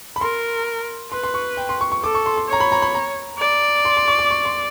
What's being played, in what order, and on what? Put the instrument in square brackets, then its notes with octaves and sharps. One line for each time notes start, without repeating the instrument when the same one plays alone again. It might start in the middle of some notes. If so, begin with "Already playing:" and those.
[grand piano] B5
[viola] A#4 [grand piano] C6
[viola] B4 [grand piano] C6
[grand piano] C6
C#6
G5
C6
C#6
C#6
[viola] A4 [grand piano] D6
[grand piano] C#6
C6
C6
[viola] C#5 [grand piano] A#5
[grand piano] B5
A#5
B5
A#5
[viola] D5
[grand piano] C6
C6
C#6
D6
C#6
C6